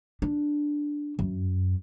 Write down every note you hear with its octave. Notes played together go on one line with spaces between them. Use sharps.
D4
F#2